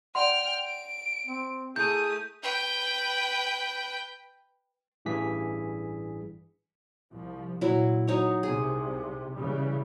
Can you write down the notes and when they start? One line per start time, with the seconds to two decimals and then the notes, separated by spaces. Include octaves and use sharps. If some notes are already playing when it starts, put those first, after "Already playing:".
0.15 D5 F#5 G5 C6 F6
0.65 D7
1.27 C4
1.76 A3 E4 G#4 D#6 G6
2.43 B4 G5
5.05 A1 G2 E3 G#4 B6
7.13 C2 F3
7.61 A#2 F#3 E4
8.07 F#3 D#4 C#5
8.43 C2 C3 G#4
9.38 C#3 E3 G3